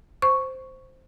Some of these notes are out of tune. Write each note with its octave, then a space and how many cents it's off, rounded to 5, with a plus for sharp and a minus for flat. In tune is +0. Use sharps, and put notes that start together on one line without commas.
C5 +0 C#6 +0